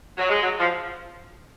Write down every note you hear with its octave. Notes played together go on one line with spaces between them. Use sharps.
F#3
G#3
F#3
F3